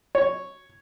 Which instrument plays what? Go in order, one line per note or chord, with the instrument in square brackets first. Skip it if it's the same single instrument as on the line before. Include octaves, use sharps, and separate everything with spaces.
[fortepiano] C#5